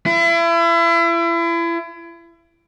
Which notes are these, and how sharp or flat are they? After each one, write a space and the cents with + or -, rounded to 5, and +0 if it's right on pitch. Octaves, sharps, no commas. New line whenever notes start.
E4 +35